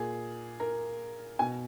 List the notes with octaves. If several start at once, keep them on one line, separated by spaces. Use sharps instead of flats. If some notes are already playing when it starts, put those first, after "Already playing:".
Already playing: A#2 G#4
A#4
B2 G#5